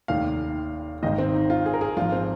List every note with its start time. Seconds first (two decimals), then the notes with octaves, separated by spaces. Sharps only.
0.08 F1 D#2 D#3 F5
1.03 G#1 G#2 D#3 D#5
1.18 C4
1.34 D#4
1.50 F4
1.66 G#4
1.74 A#4
1.81 G#4
1.97 G#1 G#2 F3 F4
2.12 C4